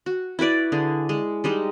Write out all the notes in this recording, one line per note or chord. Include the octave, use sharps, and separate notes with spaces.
F#4
E4 F#4 B4 D5
D3 G#4
G#3
G3 G#3 D#4